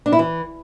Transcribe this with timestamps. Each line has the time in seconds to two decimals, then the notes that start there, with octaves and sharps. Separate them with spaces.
0.06 D4
0.12 E4
0.19 E3